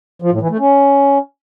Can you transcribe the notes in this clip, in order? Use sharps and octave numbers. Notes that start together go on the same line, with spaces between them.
F3
A2
E3
A3
C#4